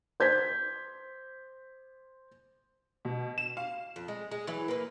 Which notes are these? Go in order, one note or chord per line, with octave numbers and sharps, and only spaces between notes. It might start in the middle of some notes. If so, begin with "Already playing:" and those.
C5 G6 G#6 B6
B2
E7
F5
F2
G#3
G#3
E3 F#3 E4
A#3 B4